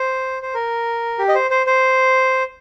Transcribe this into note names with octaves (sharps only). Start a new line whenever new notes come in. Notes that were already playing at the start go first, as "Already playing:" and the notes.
Already playing: C5
C5
A#4
G4
D#5
C5
C5
C5